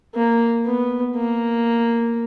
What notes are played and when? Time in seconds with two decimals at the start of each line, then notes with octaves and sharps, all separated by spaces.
0.15 A#3
0.65 B3
1.16 A#3